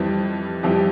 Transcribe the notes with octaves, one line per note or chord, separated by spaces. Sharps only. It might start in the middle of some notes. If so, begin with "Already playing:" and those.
Already playing: F2 E3 G3 C4
F2 E3 G3 E4 G4